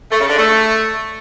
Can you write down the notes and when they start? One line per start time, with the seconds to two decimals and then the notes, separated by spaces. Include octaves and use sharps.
0.11 A3
0.20 C#3
0.29 D3
0.38 A3